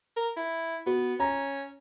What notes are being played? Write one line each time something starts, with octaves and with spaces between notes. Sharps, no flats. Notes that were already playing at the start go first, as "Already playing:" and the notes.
A#4
E4
B3 F#4
C#4 A#5